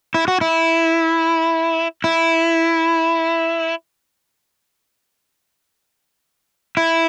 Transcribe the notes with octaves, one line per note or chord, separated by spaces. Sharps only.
E4
F#4
E4
E4
E4